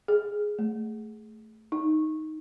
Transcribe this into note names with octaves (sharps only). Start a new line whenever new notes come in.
G#4
A3
D#4